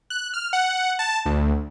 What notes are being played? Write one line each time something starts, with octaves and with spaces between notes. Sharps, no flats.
F#6
F6
F#5
A5
D2